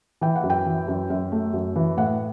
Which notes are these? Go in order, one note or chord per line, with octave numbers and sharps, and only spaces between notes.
E3 G5
F#5
F#2
G5
E3
F#2
F#2
A3
F#2
E3
A2 F#5